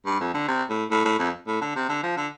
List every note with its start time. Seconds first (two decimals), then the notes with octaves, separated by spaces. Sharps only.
0.06 G2
0.20 F2
0.34 D3
0.48 C3
0.70 A2
0.91 A2
1.05 A2
1.20 F2
1.47 A2
1.61 D3
1.76 C3
1.89 D3
2.03 F3
2.17 D3